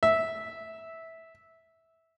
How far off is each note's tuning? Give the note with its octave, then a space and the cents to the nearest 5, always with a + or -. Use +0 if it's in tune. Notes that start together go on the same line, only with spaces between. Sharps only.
E5 -15